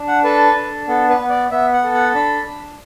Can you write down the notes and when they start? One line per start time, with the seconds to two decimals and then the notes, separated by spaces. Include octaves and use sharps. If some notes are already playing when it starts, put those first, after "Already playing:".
Already playing: D4
0.08 F#5
0.24 A4 B4
0.55 D4
0.88 B3 A4
1.09 B4
1.19 B3
1.30 D5
1.51 B3 E5
1.73 F#5
1.84 A4
1.94 F#5
2.15 D4 B5
2.46 D4